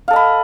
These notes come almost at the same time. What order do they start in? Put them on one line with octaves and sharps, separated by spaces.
F5 A4 D#5 B5